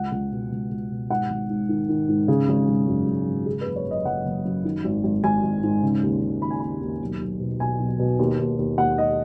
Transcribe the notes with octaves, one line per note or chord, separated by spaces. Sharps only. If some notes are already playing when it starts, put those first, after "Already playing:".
Already playing: C#2 F#5
C#2
B2
C#2
C#2
B2
G#2 F#5
G#1
G#2
D#3
D#3
G#2
C#3 G#4
G#1
G#1
F#2
F#2
G#1
C#3 G#4
B4
F#1
C#5
F#1
D#5
F#1 F#5
F#1
F#2
D#3
G#1
G#1
G#1 G#5
G#1
G#2
C#3
D#2
C#3
D#2 B5
G#5
D#2 B5
D#2
B1
B1
B2
B2 G#5
B1
B2
D#2
D#2
D#2
D#2 F#5
D#3 D#5